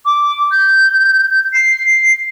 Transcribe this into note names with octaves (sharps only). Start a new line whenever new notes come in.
D6
G6
C7